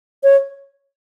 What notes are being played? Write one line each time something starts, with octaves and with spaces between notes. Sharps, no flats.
C#5